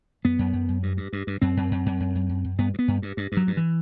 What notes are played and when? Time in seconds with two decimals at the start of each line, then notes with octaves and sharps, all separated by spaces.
0.25 F#2 B3
0.39 F#2
0.53 F#2
0.68 F#2
0.83 G2
0.97 G2
1.13 G2
1.27 G2
1.42 F#2 C4
1.57 F#2
1.71 F#2
1.86 F#2
2.00 F#2
2.15 F#2
2.29 F#2
2.45 F#2
2.58 G2 B3
2.74 G2
2.79 B3
2.88 G2
3.02 G2
3.17 G2
3.32 G2
3.37 F#3
3.47 G2
3.57 E3